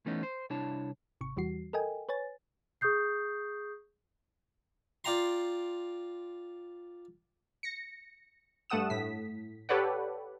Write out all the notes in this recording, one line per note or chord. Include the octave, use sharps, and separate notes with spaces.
E3 A3 B3 C#4 D#4
C5
C2 D4 E4 C#5 A5
G#1 C3 C#6
E2 E3 G3 F#4 C7
A4 A#4 D#5 G5 G#5
B4 C#5 G#5 A6
G#4 C#6 D#6 G6 C7
F4 D5 G5 A#5 C6
A#6 C#7
G2 A3 A4 F#5 D#6 E7
A2 B6
G4 A4 B4 C#5 D5 F#5